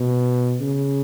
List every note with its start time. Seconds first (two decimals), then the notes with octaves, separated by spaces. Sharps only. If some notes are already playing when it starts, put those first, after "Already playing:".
Already playing: B2
0.61 C#3